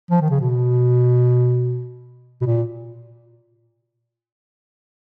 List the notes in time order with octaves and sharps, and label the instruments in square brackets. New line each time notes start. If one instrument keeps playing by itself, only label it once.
[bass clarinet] F3
D#3
C#3
B2
B2
A#2